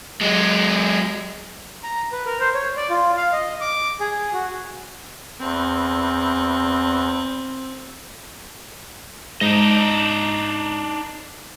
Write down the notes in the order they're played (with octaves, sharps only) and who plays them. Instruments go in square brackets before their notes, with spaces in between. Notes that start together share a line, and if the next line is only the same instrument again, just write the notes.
[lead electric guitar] F#3 G#3
[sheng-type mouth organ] A#5
B4
A#4
C5
C#5
D5
F4
F5
D#5
D6
G#4
F#4
[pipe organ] E2 [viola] C4
[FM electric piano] G#2 [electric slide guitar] D4 D#4 D#5